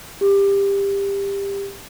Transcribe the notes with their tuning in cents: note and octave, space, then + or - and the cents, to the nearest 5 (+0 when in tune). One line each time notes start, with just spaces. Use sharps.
G4 +20